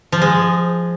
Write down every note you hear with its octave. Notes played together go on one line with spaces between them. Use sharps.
F3
G#3